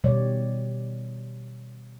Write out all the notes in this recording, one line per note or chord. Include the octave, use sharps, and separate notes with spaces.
B2 D#3 G3 C#5 D5